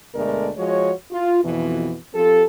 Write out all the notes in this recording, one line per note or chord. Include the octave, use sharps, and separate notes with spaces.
D2 B2 G#3 A3 A#4 D5
F3 G#3 F#4 C#5
F4
F2 B2 E3
F3 C4 G4 A4